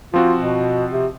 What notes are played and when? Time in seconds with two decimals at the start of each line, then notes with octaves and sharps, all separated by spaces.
0.14 F3 C4 F4 F#4
0.38 B2
0.93 C3